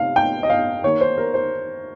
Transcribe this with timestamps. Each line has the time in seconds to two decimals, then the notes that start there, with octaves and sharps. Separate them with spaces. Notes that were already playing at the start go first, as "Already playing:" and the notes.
Already playing: C3 F5
0.16 G5
0.43 D#5
0.50 F5
0.83 D#3 A#3 C#5
1.01 C5
1.18 A#4
1.34 C5